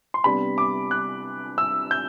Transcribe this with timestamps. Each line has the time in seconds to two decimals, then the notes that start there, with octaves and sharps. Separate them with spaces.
0.14 C6
0.24 C3 G3 B3 D4 B5
0.58 D6
0.91 F#6
1.58 E6
1.91 G6